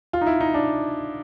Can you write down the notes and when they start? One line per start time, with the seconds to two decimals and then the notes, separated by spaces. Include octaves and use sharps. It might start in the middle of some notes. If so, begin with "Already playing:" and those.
0.13 F4
0.21 D#4
0.26 E4
0.41 D#4
0.54 D4